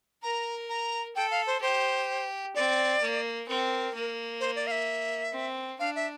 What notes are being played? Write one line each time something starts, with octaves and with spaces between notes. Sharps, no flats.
A#4 A#5
A#5
A4 G5
F5
C5
G4 C5
C4 D5
A#3
C4 A#4
A#3
C5
D5
F5
E5
C4
D4 F5
E5